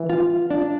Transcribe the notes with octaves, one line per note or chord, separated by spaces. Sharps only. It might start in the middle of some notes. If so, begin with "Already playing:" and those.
Already playing: E3
F4
D4